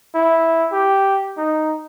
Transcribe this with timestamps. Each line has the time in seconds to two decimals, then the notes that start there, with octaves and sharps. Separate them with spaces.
0.14 E4
0.72 G4
1.37 D#4